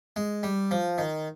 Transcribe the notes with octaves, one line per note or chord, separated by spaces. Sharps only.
G#3
G3
F3
D#3